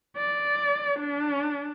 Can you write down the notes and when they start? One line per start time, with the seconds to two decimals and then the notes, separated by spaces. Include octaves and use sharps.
0.17 D5
0.99 D4